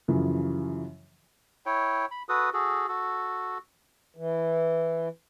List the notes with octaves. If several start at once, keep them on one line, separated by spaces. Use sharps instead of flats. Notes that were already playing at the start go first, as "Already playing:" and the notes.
F#2 C#3 E3 F3
E4 C#5 G5
B5
F#4 A4 B4 D#6
F#4 G#4 A4
F#4 A4
E3